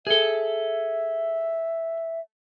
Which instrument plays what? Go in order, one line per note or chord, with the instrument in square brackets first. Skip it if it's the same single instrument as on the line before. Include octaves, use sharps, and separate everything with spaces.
[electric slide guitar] G#4 A4 [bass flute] E5